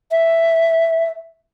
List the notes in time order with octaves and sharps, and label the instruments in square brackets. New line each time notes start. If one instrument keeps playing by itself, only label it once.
[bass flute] E5